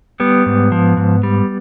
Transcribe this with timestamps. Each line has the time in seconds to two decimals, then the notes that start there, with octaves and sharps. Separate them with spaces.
0.20 G3 B3
0.46 G#2
0.72 F3
0.97 G#2
1.23 G3